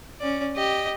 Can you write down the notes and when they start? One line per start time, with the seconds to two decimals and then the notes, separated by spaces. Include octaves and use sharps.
0.20 C#4 D5
0.56 G4 D#5